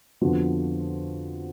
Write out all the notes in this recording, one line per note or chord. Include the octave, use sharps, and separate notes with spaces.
F2 D3 F3 B3 F#4